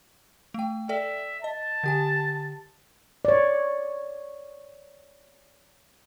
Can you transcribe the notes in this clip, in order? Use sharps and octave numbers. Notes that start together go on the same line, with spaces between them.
A3 G5
A4 D5 E5 G5
D#5 A5
D3 G4 G#5
C#5 D5